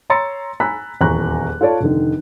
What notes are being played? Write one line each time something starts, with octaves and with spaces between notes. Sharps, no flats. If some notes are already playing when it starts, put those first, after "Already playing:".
C#5 A#5 C6 E6 A6 C#7
G#5 A#5 B5 E6 F#6 B6
D#1 E2 A#5 C#6 F#6
F4 A4 C#5 D5 A5
F1 D3 D#3